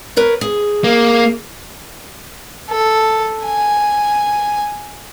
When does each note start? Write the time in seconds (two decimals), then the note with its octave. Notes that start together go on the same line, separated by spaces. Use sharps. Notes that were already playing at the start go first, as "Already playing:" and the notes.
0.16 A#4 B4 C#5
0.41 G#4
0.84 A#3
2.70 A4
3.46 G#5